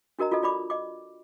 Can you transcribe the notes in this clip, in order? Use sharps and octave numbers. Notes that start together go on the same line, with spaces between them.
D4 F#4 A#4 D#5 A#5
F4 F#4 A4 D#5
F4 D5 B5 D6
D#5 D6